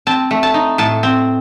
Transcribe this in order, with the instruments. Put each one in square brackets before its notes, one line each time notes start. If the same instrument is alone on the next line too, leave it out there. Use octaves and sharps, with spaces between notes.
[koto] C4 A5
A3
A5
D#4
A2 A5
C4